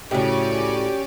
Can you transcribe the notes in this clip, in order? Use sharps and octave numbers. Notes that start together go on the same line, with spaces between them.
A2 C#3 C#4 F#4 G4 D5